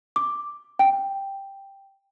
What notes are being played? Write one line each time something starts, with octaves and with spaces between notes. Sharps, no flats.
D6
G5